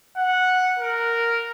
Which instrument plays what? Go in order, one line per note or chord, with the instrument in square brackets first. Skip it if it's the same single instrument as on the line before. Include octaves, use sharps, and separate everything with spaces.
[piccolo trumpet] F#5
A#4